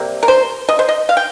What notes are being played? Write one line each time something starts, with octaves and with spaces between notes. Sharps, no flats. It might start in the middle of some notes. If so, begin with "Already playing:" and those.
Already playing: C3 G3 A#3
A#4
C5
D#5
C5
D#5
F5
G5